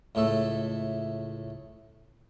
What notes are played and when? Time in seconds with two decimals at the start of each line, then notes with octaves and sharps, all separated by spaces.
0.15 C#2 A2 A3 A4